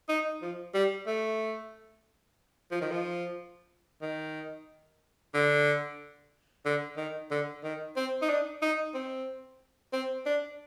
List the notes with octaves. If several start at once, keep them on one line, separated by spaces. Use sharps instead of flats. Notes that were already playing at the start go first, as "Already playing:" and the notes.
D#4
F3
G3
A3
F3
D#3
F3
D#3
D3
D3
D#3
D3
D#3
C4
D#4
D4
D#4
C4
C4
D4